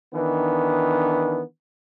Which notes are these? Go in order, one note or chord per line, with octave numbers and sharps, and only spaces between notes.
D#3 E3 B3 D4